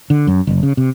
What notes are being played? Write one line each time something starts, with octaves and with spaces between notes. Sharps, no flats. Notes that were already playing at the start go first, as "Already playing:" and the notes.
D3
F#2
F#1
C#3
C3